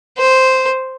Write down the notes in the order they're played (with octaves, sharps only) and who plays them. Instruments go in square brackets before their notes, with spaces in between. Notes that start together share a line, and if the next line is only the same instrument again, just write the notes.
[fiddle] C5